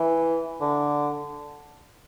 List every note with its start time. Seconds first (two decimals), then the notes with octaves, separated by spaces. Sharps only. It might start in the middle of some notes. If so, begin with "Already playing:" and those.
Already playing: E3
0.61 D3